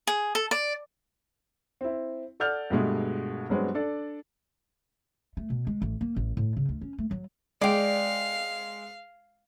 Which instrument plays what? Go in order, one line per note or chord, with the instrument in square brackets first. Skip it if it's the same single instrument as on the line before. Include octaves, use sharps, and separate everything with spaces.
[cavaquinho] G#4
A4
D5
[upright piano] C4 E4
A4 D5 F#5 F6 G6 F7
G2 B2 G#3 A3
G2 F#3 G#3 B3 C4
D4 A4 D5
[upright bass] A3
B2
G#3
A1
A#3
A1
A2
C#3
D2
C#4
A3
F#3
[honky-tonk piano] G#3 [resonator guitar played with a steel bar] D5 G5 [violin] F5